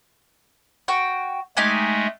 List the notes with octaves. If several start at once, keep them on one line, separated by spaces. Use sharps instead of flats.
F#4 G5
G#3 A3 D#4 G4 G#5